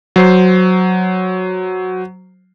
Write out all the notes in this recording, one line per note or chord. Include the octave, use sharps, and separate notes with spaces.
F#3 C5 C7